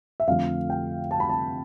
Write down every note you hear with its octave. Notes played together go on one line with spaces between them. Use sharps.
E5
F2 D3 F3 A3 F5
G5
A5
B5
A5